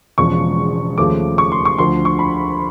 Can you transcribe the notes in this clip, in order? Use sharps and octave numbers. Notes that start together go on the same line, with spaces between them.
E1 E2 C#3 F3 G#3 C#6
D#2 C#3 F3 A3 D6
C#6
C6
C#6
D2 D3 F3 C6
C#6
B5